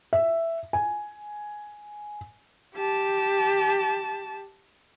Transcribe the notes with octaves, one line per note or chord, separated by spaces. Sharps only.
E5
G#5
G4 A5